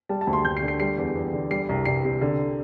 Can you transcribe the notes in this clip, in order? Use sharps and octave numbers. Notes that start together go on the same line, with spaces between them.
G3 A5
A5
D2
C6
D2 G6
C7
D3
C7
G3 C7
E2
E2
D3
G3 C7
C2
C2 C7
C3
D3